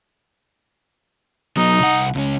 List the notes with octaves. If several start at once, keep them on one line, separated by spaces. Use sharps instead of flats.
F#3 B3 D#4
C2 F#5
C#2 C#4